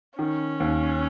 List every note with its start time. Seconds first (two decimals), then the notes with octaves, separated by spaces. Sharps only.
0.18 D#3 C#4
0.60 D#2